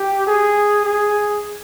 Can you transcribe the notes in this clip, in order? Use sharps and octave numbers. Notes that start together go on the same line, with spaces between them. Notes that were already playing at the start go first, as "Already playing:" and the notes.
Already playing: G4
G#4
G#4